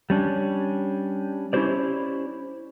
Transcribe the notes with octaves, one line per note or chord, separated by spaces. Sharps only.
G3 C#4 D4
C#4 E4 F4 G4 C5 D5